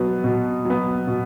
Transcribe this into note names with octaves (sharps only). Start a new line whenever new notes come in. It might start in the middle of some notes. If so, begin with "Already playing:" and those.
Already playing: B2 F#3 B3
B2
F#3 B3
B2